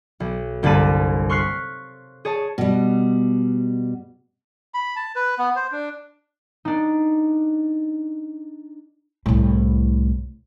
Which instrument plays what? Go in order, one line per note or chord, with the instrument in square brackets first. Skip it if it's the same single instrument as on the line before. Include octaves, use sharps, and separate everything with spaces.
[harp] B1
G1 C2 A#3 A5 B5 D#7
C6 C#6 F6 F#6 B6 C7
G#4 C#5 A5
[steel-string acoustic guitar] B2 G3
[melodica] B5
A5
B4
B3
C5
D4
[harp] D4 D#4
[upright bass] C2 A2